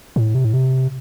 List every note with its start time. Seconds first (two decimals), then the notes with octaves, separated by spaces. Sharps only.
0.16 A2
0.35 C3
0.45 A2
0.54 C3